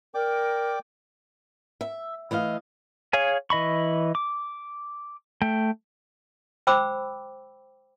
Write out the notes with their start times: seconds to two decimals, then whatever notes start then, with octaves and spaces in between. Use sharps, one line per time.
0.14 A#4 D5 G5 D6
1.81 E5
2.31 E3 A3 D#5 F5
3.13 G#4 C#5 F5 G#5
3.50 E3 D#5 B5 C#6
4.15 D6
5.42 A3 G5
6.67 C5 G5 B5 D6 E6